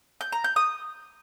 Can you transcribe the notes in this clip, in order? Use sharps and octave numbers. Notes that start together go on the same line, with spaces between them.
G6
A#5
G6
D#6